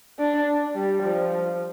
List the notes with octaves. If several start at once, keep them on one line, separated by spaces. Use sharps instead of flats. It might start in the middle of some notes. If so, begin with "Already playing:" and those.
D4
G3
F3